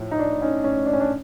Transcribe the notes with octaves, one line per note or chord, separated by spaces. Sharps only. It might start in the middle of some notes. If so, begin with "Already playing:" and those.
Already playing: A2 F3 E4
D#4
D4
C#4 D#4
C#4
D4
C#4
D4